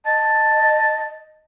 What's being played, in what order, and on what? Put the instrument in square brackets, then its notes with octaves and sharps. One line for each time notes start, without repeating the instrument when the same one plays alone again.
[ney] D#5 [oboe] A5